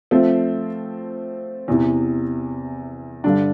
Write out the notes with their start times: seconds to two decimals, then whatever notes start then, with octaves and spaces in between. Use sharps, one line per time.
0.11 F3 A3 C4
1.68 E2 C3 E3
3.24 G2 D3 G3 D4